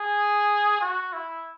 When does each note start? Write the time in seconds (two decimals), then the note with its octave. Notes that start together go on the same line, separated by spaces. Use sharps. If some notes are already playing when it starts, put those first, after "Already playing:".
Already playing: G#4
0.81 F#4
1.13 E4